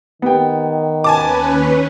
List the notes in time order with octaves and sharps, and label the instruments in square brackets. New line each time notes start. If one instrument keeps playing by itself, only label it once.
[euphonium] D#3 [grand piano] B3 G4 G5
[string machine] D#2 C#4 B4 [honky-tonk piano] G#5 A5 D6